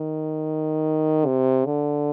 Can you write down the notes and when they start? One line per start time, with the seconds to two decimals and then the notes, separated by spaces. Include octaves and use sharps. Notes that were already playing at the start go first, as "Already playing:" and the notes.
Already playing: D#3
1.26 C3
1.66 D3